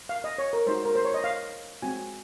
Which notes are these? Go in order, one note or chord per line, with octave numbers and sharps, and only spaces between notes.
F5
D#5
C#5
A#4
G#3 D#4 F#4 C5
A#4
C5
C#5
D#5
F5
G#3 C4 F#4 G#5